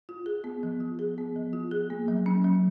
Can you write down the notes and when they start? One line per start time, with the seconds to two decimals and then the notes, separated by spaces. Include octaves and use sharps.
0.09 F4
0.26 G#4
0.44 B3
0.63 F3
0.80 F4
0.99 G#4
1.18 B3
1.36 F3
1.53 F4
1.71 G#4
1.90 A#3
2.08 F#3
2.26 C#4
2.44 F#3